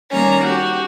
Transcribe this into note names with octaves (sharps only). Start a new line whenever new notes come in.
D#3 G3 A#3 C#4 A#5
F#4 G4